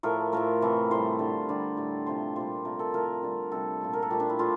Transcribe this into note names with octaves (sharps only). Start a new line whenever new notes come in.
A2 F3 A3 A#4
A2 F3 A3 A#4
C3 E3 A3
A2 G3 C5
D3 G3
D3 G3 D5
A2 G3
C3 F3 A3 C5
A#2 G3 C5
C3 F3 A3 A#4
A4
A2 F3 A3 A#4
D3 G3
C3 G3 A4
A#2 F3 A3
A#4
A4
A#2 F3 A3 G4
D4
E4
A2 F3 A3 F4